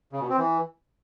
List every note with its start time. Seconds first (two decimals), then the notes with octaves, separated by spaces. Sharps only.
0.12 C#3
0.21 B2
0.29 C4
0.38 E3